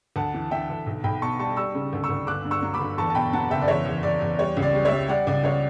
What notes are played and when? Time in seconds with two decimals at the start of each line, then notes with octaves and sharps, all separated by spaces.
0.16 D2 F#5 A5
0.34 E3
0.51 E3 E5 G5
0.70 D2
0.86 B1
1.04 B1 G5 B5
1.22 B2 A5 C#6
1.39 G3 A5 C#6
1.57 G3 C#6 E6
1.75 C#3
1.93 D2
2.04 C#6 E6
2.10 D2
2.27 G1 D6 F#6
2.45 G2
2.51 C#6 E6
2.63 F#3
2.74 B5 D6
2.80 G1
2.98 E2 A5 C#6
3.10 A5
3.15 B2 G5 B5
3.33 F#3 F#5 A5
3.50 F#1 E5 G5
3.61 D5
3.68 E2 C#5 E5
3.86 E2
4.03 E2 D5
4.21 E2
4.39 G3 C#5
4.57 C#2
4.63 D5
4.74 G3
4.85 C#5 E5
4.91 G3
5.08 G3 D5 F#5
5.27 C#2 D5
5.44 C#2 C#5